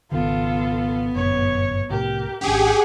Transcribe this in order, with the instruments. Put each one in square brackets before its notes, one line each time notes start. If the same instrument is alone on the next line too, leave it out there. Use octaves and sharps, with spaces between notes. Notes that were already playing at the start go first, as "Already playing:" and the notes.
[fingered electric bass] G#1 C#2 D#3 [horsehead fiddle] B3 [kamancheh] F4 A4
[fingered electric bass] G1 F#2 A#2 [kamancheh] C#5
[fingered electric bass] C2 A2 [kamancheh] G4 A#4
[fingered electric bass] G#1 C#4 D4 [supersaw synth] G4 G#4 [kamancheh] F#5